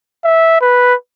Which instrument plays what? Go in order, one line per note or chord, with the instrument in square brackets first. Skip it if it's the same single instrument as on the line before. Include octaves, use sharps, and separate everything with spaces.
[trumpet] E5
B4